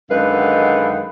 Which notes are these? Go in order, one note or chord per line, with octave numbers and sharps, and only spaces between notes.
F#2 D3 D#3 G#3 B4 F5